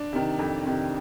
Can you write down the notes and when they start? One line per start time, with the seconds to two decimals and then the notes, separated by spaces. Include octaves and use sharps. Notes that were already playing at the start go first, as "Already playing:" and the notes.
Already playing: D4
0.13 C3 D#3
0.39 F2
0.66 C3 D#3